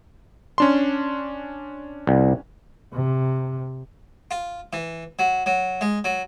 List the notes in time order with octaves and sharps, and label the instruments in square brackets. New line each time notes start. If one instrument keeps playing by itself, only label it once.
[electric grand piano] C#4 D4 C6
[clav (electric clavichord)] C2
[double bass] C3
[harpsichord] F4
E3
F#3
F#3
G#3
F#3